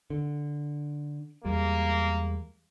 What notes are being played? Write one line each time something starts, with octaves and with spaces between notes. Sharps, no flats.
D3
E2 G3 G#3 A#3